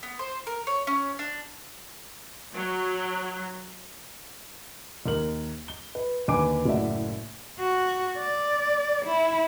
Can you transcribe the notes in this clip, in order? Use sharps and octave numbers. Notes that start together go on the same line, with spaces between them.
B3
C5
A#4
C#5
C#4
D4
F#3
D#2 A#4 F#7
G7
B4
D#2 D3 B4 G#5 D6 D7
F#1 A2 F#4 D5 E5
F#4
D5
E4